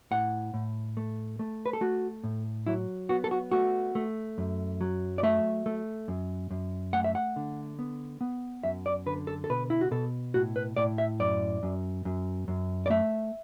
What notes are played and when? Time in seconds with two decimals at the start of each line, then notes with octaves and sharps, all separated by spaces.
0.11 A2 F#5
0.54 A2
0.97 A3
1.39 A3
1.66 B4
1.73 A4
1.81 A3 F#4
2.24 A2
2.66 F#3 E4
3.09 B3 F#4
3.24 A4
3.31 F#4
3.52 A3 F#4
3.95 A3
4.38 F#2
4.81 F#3
5.18 D5
5.23 A3 E5
5.66 A3
6.08 F#2
6.51 F#2
6.93 A3 F#5
7.04 E5
7.15 F#5
7.36 D3
7.79 B3
8.21 B3
8.64 F#2 E5
8.86 D5
9.06 D3 B4
9.27 A4
9.44 A4
9.50 B2 B4
9.70 E4
9.81 F#4
9.91 B2 A4
10.34 A2 F#4
10.56 B4
10.77 A2 D5
10.98 E5
11.20 F#2 D5
11.63 F#2
12.05 F#2
12.48 F#2
12.86 D5
12.90 A3 E5